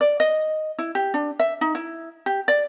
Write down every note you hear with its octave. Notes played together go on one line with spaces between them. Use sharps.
D5
D#5
E4
G4
D4
E5
D#4
E4
G4
D5